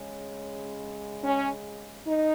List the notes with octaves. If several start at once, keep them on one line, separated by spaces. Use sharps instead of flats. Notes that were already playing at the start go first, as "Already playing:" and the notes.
Already playing: C#3 G#3 C#4
C#4
D#4